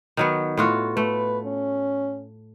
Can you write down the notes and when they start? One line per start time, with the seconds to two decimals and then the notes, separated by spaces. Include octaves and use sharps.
0.17 D#3 F#3 B3
0.57 A2 F4 F#4
0.97 A3 B4
1.45 C#4